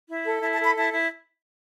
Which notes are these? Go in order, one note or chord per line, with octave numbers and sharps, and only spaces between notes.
E4
A4
E4 A5
A5
A4
B5
E4 A5
E4